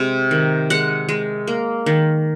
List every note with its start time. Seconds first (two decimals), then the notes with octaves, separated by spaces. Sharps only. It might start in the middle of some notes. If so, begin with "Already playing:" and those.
Already playing: C3 G#3
0.31 D#3
0.70 G#3 F#5
1.09 G#3
1.47 A#3
1.86 D#3